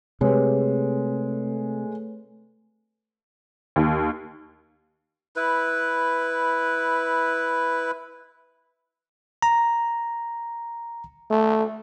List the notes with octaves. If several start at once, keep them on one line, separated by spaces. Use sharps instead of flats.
C3 G#3 A3 B4 C#5
D#2
E4 B4
A#5
A3